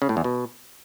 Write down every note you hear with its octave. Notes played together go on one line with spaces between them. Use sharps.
C#3
A2
E2
B2